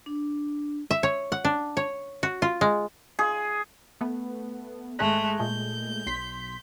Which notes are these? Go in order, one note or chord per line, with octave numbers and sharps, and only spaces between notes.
D4
E5
C#5
F#5
D4
C#5
F#4
F4
G#3
G#4
A3 B3
G#1 G#3 A3 G#4 F#6
A#2 G#3 A3 G6
B1 C6 B6